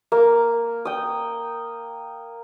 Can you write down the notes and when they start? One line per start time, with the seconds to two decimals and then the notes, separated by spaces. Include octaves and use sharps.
0.12 A#3
0.85 G5 D#6